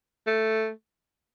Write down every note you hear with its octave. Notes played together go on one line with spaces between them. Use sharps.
A3